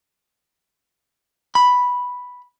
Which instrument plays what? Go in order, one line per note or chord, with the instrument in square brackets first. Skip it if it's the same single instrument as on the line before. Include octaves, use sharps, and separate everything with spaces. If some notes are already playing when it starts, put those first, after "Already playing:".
[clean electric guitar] B5